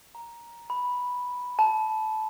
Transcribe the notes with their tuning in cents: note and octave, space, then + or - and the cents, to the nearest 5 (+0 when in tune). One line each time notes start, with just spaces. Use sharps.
A#5 +10
B5 -5
A5 -15